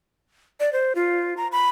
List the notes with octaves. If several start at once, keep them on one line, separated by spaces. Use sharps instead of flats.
D5
C5
F4
A#5
B5